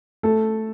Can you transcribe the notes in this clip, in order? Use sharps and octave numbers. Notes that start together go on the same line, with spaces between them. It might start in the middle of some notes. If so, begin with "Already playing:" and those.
A3 A4